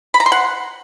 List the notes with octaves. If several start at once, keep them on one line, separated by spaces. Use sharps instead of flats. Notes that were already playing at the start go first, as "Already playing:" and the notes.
B5
A#5
C6
F#5